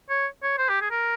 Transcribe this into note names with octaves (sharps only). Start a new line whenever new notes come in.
C#5
C#5
C5
G4
G#4
A#4